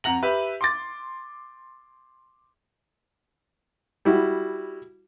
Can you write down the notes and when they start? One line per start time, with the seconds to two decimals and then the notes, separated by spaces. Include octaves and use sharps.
0.04 F2 F#5 A#5 F#7
0.22 G4 B4 E5
0.61 C6 D6 A6
4.05 G3 E4 F#4